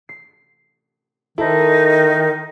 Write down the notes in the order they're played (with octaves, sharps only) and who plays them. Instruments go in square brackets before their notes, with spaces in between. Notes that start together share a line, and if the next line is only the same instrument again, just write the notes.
[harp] C7
[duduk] D#3 [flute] D#4 [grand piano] E4 [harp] A4 C5